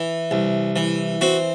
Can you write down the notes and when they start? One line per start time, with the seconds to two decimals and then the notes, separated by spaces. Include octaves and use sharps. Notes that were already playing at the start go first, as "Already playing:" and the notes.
Already playing: E3
0.31 C2
0.76 E3
1.21 C4 F#4